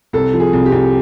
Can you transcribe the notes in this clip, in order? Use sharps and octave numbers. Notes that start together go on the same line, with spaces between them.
C2 A4
F3
G#4
C2
G4
C2